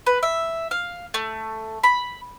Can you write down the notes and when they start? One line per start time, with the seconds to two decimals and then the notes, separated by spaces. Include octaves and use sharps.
0.06 B4
0.23 E5
0.71 F5
1.14 A3
1.84 B5